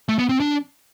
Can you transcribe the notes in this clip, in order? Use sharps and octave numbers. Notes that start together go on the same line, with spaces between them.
A3
B3
C4
D4